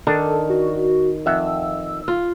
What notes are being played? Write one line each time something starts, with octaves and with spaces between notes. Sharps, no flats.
D#3 D4 A4
F#4
F2 E5 F#5 E6
F4